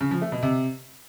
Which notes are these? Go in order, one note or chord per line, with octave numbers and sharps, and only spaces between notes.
C#3
F3
A3
B2
C3